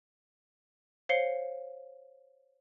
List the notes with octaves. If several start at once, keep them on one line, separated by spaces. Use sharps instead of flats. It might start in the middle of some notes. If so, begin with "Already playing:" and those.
C5 C#5 F5 C7 C#7 G7